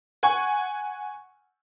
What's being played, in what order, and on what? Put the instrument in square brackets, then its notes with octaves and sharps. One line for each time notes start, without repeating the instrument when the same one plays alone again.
[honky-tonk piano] F#5 G#5 C#6